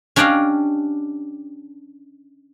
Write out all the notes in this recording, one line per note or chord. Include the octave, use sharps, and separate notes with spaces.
C#4 D4 G4 D5 D#5 F5